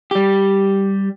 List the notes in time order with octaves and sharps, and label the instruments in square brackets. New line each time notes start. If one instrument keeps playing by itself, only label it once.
[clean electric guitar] G3 G4